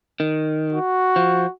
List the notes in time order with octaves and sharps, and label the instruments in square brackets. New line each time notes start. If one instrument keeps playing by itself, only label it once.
[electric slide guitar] D#3
[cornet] F#4
[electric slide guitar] F3